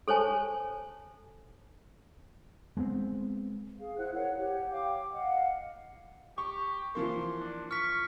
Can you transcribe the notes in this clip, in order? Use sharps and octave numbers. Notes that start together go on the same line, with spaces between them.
A4 C5 C#5 G#5 A5
G#3 B3 C4
G#4 F5
E4 C5 F#5 F#6
A#4 C#5 F5 F#5
G4 C#5 F#5
F5 G5 D6
D#5 F5 F#5
G4 C#6
E3 F3 A#3 C6
D4
C#6 F6 B6